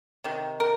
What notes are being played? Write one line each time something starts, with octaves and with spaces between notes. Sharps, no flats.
C3 D#3
A#4